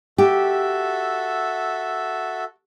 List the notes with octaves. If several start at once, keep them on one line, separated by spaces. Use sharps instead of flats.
F#4 G4 A4 E5